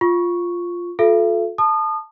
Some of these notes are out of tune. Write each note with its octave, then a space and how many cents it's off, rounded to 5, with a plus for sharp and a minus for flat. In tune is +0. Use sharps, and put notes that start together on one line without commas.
F4 +0 C#6 +0
F4 +35 A4 -15 E5 +45
A5 +0 D#6 -35